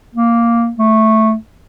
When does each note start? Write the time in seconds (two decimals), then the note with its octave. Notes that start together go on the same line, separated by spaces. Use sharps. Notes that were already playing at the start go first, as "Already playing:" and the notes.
0.15 A#3
0.78 A3